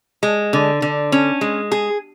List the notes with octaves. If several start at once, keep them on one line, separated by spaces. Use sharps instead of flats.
G#3
D3
D3
C#4
G#3
G#4